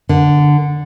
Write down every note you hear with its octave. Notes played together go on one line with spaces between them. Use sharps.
D3